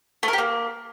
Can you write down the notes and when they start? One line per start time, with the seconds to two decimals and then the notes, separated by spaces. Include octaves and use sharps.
0.23 A3
0.28 A#4
0.33 G4
0.38 A#3